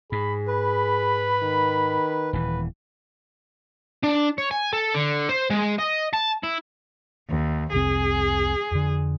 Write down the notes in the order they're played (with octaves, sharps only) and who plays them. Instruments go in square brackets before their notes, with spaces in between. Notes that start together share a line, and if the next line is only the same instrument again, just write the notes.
[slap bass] G#2 [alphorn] G#4 [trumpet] B5
[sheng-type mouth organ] B4 [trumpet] B5
[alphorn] D#3
[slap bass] D#1 E3 [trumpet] B4
[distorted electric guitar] D4
C#5
G#5
A4
D3
C5
G#3
D#5
A5
E4
[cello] D#2
[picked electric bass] F1 C2 C4 [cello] G#4
[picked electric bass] F2 D3